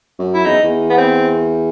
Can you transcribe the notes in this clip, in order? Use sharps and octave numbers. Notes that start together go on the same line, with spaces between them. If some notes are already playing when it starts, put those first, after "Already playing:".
F#2
E4
E2 D#4
E2
B3
C4